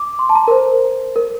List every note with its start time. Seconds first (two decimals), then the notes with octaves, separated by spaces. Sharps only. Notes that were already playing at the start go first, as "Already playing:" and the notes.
Already playing: D6
0.19 C6
0.29 A5
0.35 A#5
0.48 A#4
0.51 C5
1.16 A#4